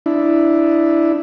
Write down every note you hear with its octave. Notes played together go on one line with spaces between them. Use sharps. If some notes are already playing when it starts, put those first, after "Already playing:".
D4 E4